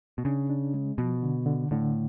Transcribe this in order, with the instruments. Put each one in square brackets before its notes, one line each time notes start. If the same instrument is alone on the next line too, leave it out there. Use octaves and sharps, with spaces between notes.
[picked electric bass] B2
[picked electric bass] C#3 [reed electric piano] D4
[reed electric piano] D4
G#3
[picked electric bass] B2 [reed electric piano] F3
[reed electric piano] D3
D3
[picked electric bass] A2 [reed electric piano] D3